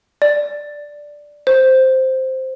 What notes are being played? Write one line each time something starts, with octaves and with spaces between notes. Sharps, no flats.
D5
C5